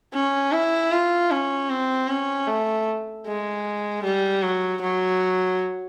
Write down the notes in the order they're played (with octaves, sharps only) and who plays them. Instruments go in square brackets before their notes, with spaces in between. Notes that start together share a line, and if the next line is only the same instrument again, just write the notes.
[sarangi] C#4
E4
F4
C#4
C4
C#4
A3
G#3
G3
F#3
F#3